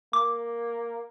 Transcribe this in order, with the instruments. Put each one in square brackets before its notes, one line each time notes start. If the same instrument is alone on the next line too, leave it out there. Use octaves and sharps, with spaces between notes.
[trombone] A#3 [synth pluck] D6